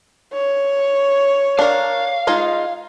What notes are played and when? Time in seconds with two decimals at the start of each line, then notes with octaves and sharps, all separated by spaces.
0.33 C#5
1.59 D4 A#4 F5
2.27 G#3 D#4 F4